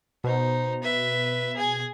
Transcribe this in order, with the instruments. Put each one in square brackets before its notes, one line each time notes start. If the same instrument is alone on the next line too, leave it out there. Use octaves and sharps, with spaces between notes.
[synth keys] B2 [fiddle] D#4 C5
[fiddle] B4 E5
G#4 G#5